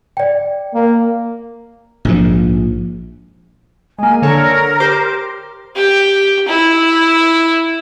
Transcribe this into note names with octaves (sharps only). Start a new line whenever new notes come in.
D5 G5
A#3
A#1 G#2
G#3 A#3 G#5
D3 A4 A#4 C#5
G4 C5 D6
G4
E4